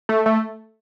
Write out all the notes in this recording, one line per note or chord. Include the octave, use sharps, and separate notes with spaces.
A3
A3